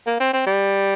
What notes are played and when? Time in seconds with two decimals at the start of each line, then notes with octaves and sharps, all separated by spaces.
0.07 A#3
0.20 C4
0.34 C4
0.47 G3